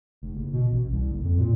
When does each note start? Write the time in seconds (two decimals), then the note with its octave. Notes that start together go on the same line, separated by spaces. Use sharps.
0.22 F1
0.35 F#1
0.53 B2
0.71 A1
0.92 C2
1.11 F#1
1.24 F2
1.39 A#2